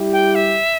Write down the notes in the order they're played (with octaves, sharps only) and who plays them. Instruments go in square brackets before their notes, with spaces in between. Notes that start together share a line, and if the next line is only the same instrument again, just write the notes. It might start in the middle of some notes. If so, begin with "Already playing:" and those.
Already playing: [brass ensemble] G3 E4 G4
[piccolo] G5
E5